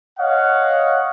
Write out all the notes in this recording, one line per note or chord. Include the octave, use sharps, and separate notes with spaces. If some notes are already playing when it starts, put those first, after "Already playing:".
C#5 D#5 F5 F#5